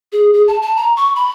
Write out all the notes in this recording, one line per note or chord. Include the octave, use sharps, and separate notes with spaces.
G#4
G#4
A5
A5
A#5
C#6
B5